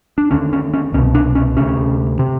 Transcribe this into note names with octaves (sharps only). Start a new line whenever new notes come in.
D4
D#2 D3 C#4
C#4
C#4
C2 B2 C#4
D4
C#4
D2 C3 C#4
C3